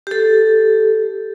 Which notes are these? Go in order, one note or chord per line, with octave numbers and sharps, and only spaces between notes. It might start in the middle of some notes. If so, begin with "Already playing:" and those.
G4 A4